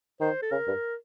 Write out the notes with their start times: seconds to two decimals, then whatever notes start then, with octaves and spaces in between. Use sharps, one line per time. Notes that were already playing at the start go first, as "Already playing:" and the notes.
0.20 D#3 C5
0.42 A4
0.51 C#3 A#4
0.67 G2